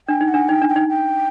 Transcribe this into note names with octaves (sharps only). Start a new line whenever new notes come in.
D4 G5
D#4
F#5
D4
D#4 G5
D4
G5
D#4
G5